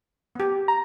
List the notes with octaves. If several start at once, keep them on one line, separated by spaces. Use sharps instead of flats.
B3 G4
A#5